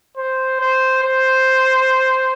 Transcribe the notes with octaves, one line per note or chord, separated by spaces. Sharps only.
C5
C5
C5